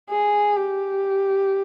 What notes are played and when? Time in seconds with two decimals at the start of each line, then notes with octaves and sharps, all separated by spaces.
0.10 G#4
0.56 G4